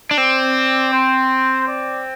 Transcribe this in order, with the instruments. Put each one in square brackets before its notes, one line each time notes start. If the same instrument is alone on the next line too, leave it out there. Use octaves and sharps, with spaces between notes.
[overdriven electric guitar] D4
[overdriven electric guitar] C4 [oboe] D5
[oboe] C5
D5